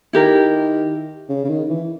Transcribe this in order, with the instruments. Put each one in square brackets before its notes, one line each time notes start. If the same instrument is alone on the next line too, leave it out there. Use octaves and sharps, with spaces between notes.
[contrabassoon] D#3 [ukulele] E4 G4 A#4
[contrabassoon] C#3
C#3
D#3
E3